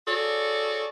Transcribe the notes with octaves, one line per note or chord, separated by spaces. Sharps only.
F#4 G#4 A4 C#5 D5